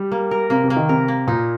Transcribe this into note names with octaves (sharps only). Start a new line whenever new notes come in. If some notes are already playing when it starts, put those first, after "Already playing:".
Already playing: G3 G4
A#3
A#4
C3 A#3
C3
A#3
D#3
C3 A#4
A#3
A#2 D#4